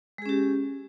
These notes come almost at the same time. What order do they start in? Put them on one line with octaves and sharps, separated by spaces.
G#3 G#4 C#4 G4